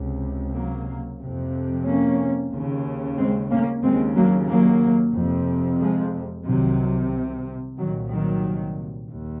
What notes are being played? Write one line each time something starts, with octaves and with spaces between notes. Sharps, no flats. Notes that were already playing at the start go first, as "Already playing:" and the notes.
Already playing: C#2 C3
F#3 A#3
F2 C3
A#3 C#4
D#2 C#3
G#3 C4
A#3 C#4
D#2 C#3 G#3 C4
F#3 A#3
F#3 A#3
F2 C3
F3 G#3
C2 C3 D#3 F#3
C2 A#2 D#3 F#3
D#3 F#3
D#2